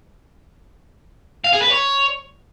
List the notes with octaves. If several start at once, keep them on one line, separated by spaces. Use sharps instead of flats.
F5
G#4
B4
C#5